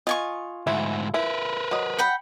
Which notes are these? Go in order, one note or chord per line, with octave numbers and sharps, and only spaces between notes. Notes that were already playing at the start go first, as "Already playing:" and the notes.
F4 D#5 G#5 C#6
D2 G#2 E4
E4 A#4 B4
F#3 D#5
F#5 G5 B5